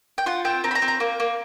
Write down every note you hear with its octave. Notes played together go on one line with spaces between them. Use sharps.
G5
F4 F#5
C4 G5
C4 A#5
B5
A#5
C4
A#5
A#3
A#3